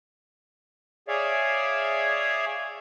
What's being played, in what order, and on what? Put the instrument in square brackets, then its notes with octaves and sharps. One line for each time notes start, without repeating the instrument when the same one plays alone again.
[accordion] G#4 C#5 D5 E5 F5